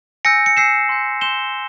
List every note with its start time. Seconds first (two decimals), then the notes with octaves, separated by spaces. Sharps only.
0.25 G#5 E6 G6 A#6 C#7
0.46 C#7
0.57 G#5 E6 G6 C7 E7
0.89 C6 G6
1.21 C6 G6 E7 G7